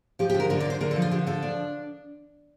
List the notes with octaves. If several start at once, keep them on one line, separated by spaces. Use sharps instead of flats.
F3 G4
G4
D3
A#4
D3 A#4
D5
D3 C5
D3 A#4
A4
F3
F4
D3 G4
F3 A4
D4